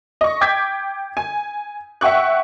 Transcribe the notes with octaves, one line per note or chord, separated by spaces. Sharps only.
D#5 C#6
G5 D6 G6 G#6 B6
G#5
E5 F#5 G5 C#6 F#6